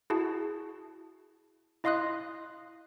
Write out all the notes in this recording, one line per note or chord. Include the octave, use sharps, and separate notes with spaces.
E4 F#4 G#4 A5
E4 D#5 F5 C6 D#6 F#6